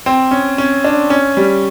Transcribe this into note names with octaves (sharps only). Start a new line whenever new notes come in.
C4
C#4
C#4
D4
C#4
G3